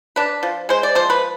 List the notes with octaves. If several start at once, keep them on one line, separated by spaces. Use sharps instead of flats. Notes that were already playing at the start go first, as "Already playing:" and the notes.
D4 B4
F3
G#3 C5
D5
F3 C5
B4